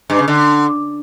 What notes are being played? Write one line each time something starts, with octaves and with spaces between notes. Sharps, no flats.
G2
C#3
D3